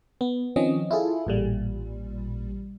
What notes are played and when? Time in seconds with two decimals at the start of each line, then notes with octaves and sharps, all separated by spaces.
0.21 B3
0.56 D#3 F3 C4 C#4 D#5
0.91 E4 F4 G#4 A4
1.27 A1 A#2 G3